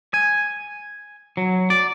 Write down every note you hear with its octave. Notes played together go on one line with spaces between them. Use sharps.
G#5
F#3
D5